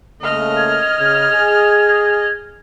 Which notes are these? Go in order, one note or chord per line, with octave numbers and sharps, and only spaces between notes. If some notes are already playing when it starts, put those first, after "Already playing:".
C#3 A3 A#3 D#5 F6
G#6
C#3 G#6
G#4